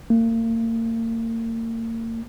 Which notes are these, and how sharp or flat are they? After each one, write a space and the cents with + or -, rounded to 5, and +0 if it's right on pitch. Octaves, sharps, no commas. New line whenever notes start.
A#3 -40